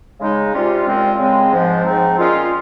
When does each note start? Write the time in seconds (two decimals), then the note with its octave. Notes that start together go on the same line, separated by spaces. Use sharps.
0.20 C#3 G#3 D#4
0.53 C3 G3 C#4 F4
0.86 A#2 G#3 C4 F4
1.18 C#3 G#3 C4
1.52 G#2 F3 G#3
1.85 G#2 F3 C4 D#4
2.17 A#2 G#3 C#4 F4